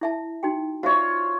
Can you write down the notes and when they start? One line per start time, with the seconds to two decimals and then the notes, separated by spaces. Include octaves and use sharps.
0.01 E4 E5 A5
0.43 D#4 F#4 G5
0.83 F4 F#4 C5 C#5 E5